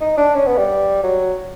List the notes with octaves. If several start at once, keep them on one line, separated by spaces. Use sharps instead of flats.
D#4
D4
C#4
B3
G3
F#3